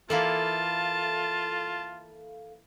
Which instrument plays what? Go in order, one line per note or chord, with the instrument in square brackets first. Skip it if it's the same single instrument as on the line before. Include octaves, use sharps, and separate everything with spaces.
[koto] E3 A#3 E4 [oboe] F4 [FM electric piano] A4 F5 [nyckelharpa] A5